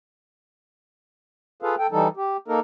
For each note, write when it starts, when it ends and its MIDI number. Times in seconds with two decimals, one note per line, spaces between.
1.62 1.75 65
1.62 1.75 68
1.62 1.75 69
1.62 1.75 71
1.62 1.75 77
1.78 1.87 69
1.78 1.87 79
1.92 2.08 52
1.92 2.08 55
1.92 2.08 63
1.92 2.08 69
2.17 2.37 67
2.48 2.60 58
2.48 2.60 63
2.48 2.60 69
2.48 2.60 70